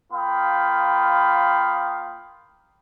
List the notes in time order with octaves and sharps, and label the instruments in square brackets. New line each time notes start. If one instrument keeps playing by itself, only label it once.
[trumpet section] A#3 F4 F5 G5 B5 D#6